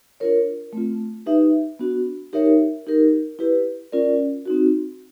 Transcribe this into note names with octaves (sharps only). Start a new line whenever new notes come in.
D4 F4 A#4 C#5
A3 C4 F4
D#4 G4 B4 E5
B3 D4 F#4
D#4 G4 A#4 C#5 E5
D#4 G4 A#4
E4 G4 B4
C#4 F4 A#4 D5
C4 D#4 F#4